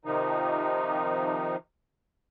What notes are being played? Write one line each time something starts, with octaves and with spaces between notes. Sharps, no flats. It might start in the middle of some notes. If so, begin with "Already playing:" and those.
C3 D#3 F3 D#4